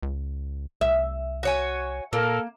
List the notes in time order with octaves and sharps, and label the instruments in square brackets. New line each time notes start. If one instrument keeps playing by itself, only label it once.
[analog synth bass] C#2
[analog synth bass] C2 [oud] E5
[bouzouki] F#4 C#5 G#5
[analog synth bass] A#2 [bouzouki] A#3 [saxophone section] A4 A#4